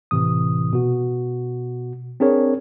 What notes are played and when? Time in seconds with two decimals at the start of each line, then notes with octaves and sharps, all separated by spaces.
0.11 A2 C3 E3 D#6
0.73 B2 F#4
2.20 C4 D4 G#4 A#4 C#5